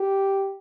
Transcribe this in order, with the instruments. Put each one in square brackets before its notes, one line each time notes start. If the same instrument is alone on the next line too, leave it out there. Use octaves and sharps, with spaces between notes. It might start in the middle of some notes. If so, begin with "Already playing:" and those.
Already playing: [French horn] G4